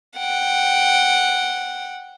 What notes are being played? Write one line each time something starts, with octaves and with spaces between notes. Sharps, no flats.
F#5 G5